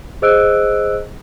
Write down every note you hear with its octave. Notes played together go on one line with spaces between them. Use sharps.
G#4 C5 D#5 E6 F#6 D7